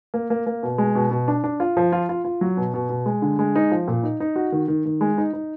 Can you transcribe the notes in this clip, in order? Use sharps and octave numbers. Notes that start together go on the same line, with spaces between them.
A#3
A#3
A#3
B2
G#3
B2
B2
D4
D4
F4
F3
F4
F4
F4
F#3
B2
B2
B2
G#3
D3
G#3
D#4
F3
A#2
D#4
D#4
F#4
D#3
D#3
D#3
G#3
D#4
D#4